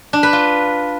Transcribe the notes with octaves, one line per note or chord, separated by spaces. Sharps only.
D4
B4
F4